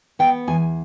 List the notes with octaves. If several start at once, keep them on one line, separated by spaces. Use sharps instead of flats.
B3 G5
E2 G#5